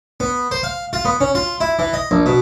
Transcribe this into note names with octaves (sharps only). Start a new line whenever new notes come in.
B3
C5
F5
F4
B3
C#4
F4
E4
E3
D#5
A#1
B2